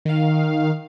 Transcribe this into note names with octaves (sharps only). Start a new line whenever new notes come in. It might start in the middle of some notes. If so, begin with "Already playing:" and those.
D#3 F5